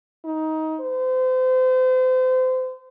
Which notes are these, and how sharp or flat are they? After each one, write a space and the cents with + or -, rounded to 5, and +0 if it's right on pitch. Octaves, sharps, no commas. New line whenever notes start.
D#4 +20
C5 -35